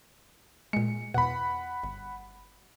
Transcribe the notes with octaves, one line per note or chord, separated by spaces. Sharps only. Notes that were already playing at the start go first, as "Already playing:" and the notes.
A#2 G#3 C#7
E2 B2 F#5 B5
G1